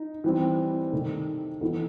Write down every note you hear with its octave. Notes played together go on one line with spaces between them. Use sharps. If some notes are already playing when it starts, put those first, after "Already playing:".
Already playing: D#4
E3 G3 C4
C3 D#3 A3 D#4
E3 B3 D#4 A4